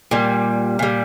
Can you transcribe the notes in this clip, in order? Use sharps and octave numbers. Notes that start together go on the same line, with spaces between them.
A#2 G3
A#2 G3